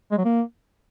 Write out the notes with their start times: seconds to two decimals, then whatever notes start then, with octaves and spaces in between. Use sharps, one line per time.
0.11 G#3
0.18 F#3
0.25 A#3